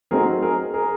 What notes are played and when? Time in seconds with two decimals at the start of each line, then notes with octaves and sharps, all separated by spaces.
0.11 F#3 A3 C4 D#4 G#4 A#4
0.42 G#4 A#4
0.74 G#4 A#4